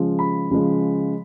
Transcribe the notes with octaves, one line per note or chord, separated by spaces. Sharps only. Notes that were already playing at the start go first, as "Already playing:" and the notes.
Already playing: C#3 F3 G#3
B5
C#3 F3 G#3